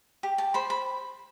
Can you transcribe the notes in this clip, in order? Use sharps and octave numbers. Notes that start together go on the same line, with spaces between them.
G4
A5
C5 B5
B5